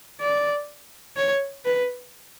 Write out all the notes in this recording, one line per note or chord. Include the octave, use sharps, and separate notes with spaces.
D5
C#5
B4